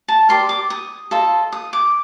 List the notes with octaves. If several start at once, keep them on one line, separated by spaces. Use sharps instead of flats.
A5
G4 A#4 D5 C6
D6
D#6
F4 A4 D#5
D#6
D6